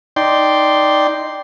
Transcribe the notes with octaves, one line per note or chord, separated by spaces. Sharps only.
D#4 D5 G5 C6